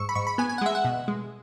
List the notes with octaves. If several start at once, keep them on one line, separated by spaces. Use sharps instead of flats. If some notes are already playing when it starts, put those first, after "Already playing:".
Already playing: G#2 C#6 E6
B5
G#2 C#6
B5
B3 G#5
G#5
F#5
G#3 E5
F#5
B2
G#3